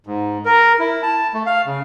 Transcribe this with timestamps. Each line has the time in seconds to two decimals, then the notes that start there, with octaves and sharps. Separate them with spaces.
0.07 G#2
0.45 A#4
0.79 E4
1.03 A5
1.34 A3
1.46 F5
1.66 C#3